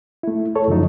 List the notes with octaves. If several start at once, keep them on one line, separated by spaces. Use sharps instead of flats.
A3 E4
A4 C#5
F#2 C#3 F3 F#3 D#4